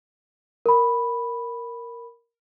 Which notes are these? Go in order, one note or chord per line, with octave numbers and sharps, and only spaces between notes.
A#4 B5